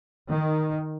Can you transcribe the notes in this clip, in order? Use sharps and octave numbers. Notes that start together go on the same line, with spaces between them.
D#3